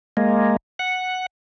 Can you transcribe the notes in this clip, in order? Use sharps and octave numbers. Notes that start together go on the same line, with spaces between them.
G#3 A#3
F#5